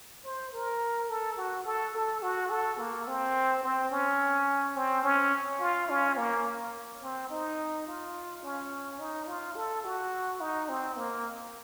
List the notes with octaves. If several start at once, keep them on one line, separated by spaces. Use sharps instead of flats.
C5
A#4
A4
F#4
A4
A4
F#4
A4
A#3
C4
C4
C#4
C4
C#4
F4
C#4
A#3
C4
D#4
F4
C#4
D#4
F4
A4
F#4
D#4
C4
A#3